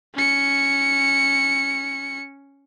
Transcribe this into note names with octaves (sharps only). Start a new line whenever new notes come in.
C#4 C#7